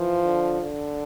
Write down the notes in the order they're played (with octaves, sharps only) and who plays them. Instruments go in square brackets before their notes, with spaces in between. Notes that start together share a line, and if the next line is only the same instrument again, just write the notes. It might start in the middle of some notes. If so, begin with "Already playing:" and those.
Already playing: [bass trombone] E3 [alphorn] F3
[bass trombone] D3
D3